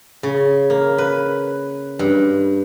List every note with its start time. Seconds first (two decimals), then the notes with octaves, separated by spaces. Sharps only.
0.23 C#3
0.70 A#3
0.98 B4
1.99 G2